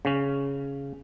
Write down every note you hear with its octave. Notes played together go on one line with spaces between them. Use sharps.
C#3 C#4